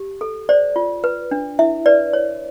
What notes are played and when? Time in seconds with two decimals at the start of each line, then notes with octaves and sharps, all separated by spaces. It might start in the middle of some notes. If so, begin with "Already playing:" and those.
Already playing: G4
0.21 A4
0.49 C5 D5
0.76 F4
1.04 B4
1.31 D4
1.59 E4 E5
1.86 B4 D5
2.13 C#5